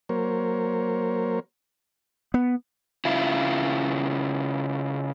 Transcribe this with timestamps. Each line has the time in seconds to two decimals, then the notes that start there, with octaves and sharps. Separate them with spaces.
0.09 F#3 A#3 A#4 C5 C#5
2.34 B3
3.05 C#3 E4 F4